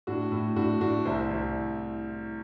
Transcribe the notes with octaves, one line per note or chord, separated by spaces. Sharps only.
A2 D4 F#4
A2
A2 D4 F#4
A2 D4 F#4
C2 C5 E5
C2